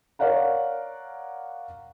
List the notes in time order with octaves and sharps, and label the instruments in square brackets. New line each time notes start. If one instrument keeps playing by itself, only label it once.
[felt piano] A#4 C#5 D5 F5 F#5 A#5